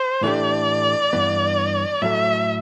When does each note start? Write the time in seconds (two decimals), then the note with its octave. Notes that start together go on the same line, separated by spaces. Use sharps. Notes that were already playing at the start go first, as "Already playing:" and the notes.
Already playing: C5
0.23 A2 E3 A3 D4 G4 D5
1.13 G2 E3 B3
2.02 A2 F#3 A3 E5